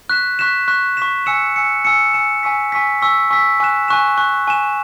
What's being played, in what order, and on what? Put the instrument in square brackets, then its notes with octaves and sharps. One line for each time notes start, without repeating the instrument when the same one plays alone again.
[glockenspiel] C#6 F#6 B6 E7
C#6 F#6 B6 E7
C#6 F#6 B6 E7
C#6 F#6 B6 E7
G#5 E6 C#7 E7
G#5 E6 C#7 E7
G#5 E6 C#7 E7
G#5 E6 C#7 E7
G#5 C#6 E6 B6
G#5 C#6 E6 B6
G#5 C#6 E6 B6
G#5 C#6 E6 B6
G#5 C#6 F#6 E7
G#5 C#6 F#6 E7
G#5 C#6 F#6 E7
G#5 C#6 F#6 E7